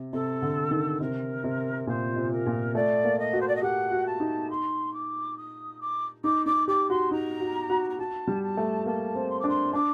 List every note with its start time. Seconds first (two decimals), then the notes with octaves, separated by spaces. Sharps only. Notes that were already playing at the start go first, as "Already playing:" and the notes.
Already playing: C3
0.13 C3 A4
0.42 D3
0.71 D#3
1.01 C3 A#4
1.44 C3
1.87 A#2 C5
2.16 C3
2.31 A#4
2.46 A#2
2.75 A3 D5
3.04 A#3
3.18 D#5
3.33 F#4
3.40 C5
3.47 D5
3.55 D#5
3.62 G4 F#5
3.92 F#4
4.06 A5
4.20 D#4
4.50 C6
4.93 D6
5.37 D#6
5.80 D6
6.24 D#4 D6
6.46 D#4 D6
6.68 G4 D6
6.89 F#4 C6
7.11 D#4 A#5
7.40 F#4
7.70 F#4
7.89 A#5
7.99 F#4 A5
8.28 G3
8.42 A5
8.57 A3
8.86 A#3 A5
9.15 C4
9.29 C6
9.39 D6
9.44 D4 C6
9.73 D4 D6